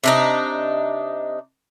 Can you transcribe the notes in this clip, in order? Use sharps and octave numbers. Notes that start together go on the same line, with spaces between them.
C3 D4 D#4